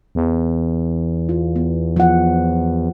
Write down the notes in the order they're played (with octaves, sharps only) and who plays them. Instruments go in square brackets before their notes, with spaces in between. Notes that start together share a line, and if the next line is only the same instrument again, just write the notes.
[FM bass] E2
[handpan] F4
B3
F3 F#5